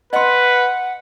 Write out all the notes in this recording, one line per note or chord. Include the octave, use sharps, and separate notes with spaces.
B4 D#5 F#5 C6